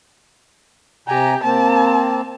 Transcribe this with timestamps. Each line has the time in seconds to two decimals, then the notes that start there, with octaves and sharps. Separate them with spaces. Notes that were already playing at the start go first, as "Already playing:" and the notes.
1.08 C3 G4 G#5 A#5
1.43 A#3 C4 A5